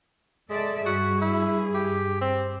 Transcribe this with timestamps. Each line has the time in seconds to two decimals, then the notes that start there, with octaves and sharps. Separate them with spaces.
0.50 G#3 A4 D5 E5
0.86 G2 F#4 G#4
1.22 E4
1.74 G4
2.21 C4